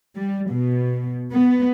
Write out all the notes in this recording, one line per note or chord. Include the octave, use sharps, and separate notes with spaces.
G3
B2
B3